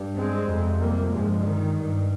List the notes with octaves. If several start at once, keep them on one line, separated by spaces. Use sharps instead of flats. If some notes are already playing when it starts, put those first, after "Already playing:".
Already playing: G2
G#3 C4
F2 C3
G3 A#3
G2 F3 G#3
D#3
G2